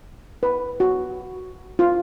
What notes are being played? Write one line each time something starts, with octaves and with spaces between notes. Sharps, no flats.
B4
F#4
F4